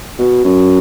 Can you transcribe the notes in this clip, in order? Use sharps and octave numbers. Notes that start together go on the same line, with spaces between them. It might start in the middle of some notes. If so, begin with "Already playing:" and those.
B2
F#2